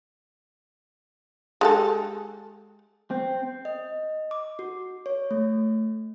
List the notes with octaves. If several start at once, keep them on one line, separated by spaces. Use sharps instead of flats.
G#3 G4 A4
C4
D#5
D6
F#4
C#5
A3